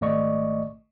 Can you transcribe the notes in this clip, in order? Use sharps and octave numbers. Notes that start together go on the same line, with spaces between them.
G#1 A3 D5 D#5 C#6